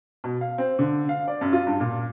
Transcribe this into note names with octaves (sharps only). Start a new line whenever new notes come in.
B2
F5
C4
D3
F5
D5
F#2
F4
G2
A#2